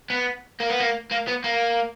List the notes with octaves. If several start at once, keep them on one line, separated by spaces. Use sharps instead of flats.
B3
A#3
B3
A#3
A#3
B3
A#3